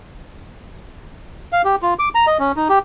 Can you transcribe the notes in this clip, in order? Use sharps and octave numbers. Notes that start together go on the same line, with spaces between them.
F5
G4
F4
D6
A#5
D#5
C#4
D#4
G4